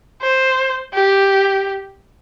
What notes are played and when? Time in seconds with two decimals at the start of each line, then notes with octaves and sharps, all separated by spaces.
0.22 C5
0.94 G4